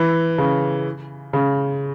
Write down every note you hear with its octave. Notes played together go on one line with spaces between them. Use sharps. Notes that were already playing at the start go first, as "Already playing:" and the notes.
Already playing: E3
C#3
C#3